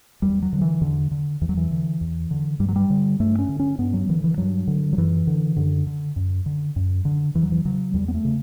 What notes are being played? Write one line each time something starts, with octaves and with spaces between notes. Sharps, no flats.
E2 G3
F#3
D3
E3
E2 D3
D3
E2 E3
F#3
E3
D3
E2
D3
G2 G3
F#3
G3
D3
G2 A3
C#4
D3
C#4
G2 B3
F#3
D3 E3
E3
G2 F#3
D3
F#3
F#2 E3
D3
F#2 D3
D3
F#2
D3
F#2
D3
E2 E3
F#3
E3
C#3 F#3
E2 G3
B3
A3
C#3